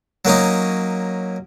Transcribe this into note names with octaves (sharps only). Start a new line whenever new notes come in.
F#3 A#3 C#4 D#4